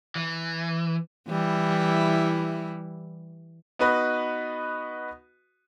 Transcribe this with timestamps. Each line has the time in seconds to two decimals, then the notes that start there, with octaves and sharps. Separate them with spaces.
0.16 E3
1.28 E3 G3 E4
3.79 B3 D#4 F#4 B4